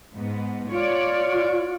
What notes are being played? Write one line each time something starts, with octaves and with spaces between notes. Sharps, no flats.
G#2 B3
F4 C#5 D5